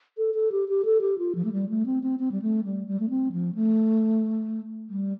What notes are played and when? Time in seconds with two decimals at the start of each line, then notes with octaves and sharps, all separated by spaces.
0.17 A4
0.34 A4
0.52 G4
0.69 G4
0.85 A4
1.01 G4
1.18 F4
1.35 F3
1.45 A3
1.52 G3
1.69 A3
1.86 C4
2.03 C4
2.19 C4
2.32 G3
2.42 A3
2.64 G3
2.87 G3
3.00 A3
3.10 C4
3.32 F3
3.55 A3
4.90 G3